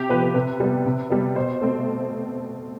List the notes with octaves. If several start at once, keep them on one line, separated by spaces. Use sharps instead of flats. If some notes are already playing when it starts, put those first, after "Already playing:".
Already playing: C3 G4
F3 B3 B4
B4
C3 B4
G3 B3
C3
G3 B3
B2 C5
A3 C4